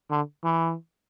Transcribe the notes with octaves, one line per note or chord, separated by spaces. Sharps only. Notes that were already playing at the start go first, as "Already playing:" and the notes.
D3
E3